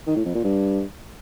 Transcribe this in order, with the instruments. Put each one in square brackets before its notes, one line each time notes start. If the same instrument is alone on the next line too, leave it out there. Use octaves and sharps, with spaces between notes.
[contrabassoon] D#3
A2
F2
A#2
G2